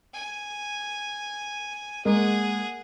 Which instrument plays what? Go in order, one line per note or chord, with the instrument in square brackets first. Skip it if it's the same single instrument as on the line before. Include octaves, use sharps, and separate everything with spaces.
[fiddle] G#5
[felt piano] G#3 A#3 [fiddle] G#4 F#5